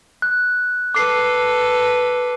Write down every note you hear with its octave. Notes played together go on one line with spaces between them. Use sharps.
F#6
A4 B4 D6 C7